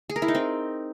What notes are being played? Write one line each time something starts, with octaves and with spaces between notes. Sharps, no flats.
G#4
A#4
E4
D#4
C4